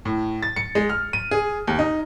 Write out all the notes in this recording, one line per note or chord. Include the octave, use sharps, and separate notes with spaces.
A2
A6
C#7
G#3
F6
D#7
G#4
D#2
D#4